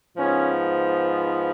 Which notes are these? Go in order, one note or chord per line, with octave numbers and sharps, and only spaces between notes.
G#2 F3 B3 C#4